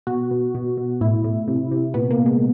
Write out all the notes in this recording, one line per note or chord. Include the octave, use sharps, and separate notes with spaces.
B2 F#4
B2
B2
B2
A2 E4
A2
C3
C3
A#2 B3
A#3
A#2
G#3